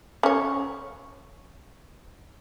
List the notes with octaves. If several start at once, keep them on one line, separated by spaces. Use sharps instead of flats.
C#4 C#5